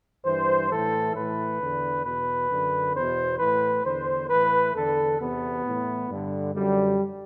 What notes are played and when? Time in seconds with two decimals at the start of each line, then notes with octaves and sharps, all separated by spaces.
0.24 G2 E3 C5
0.69 A2 E3 A4
1.14 A2 E3 B4
1.60 E2 D3
2.04 E2 B2 B4
2.49 F#2 D3
2.94 E2 B2 C5
3.39 A2 E3 B4
3.84 E2 D3 C5
4.29 A2 E3 B4
4.74 E2 D3 A4
5.19 E2 C3 E3 B3
5.64 A2 E3
6.10 G2 D3
6.54 F#2 D3 G3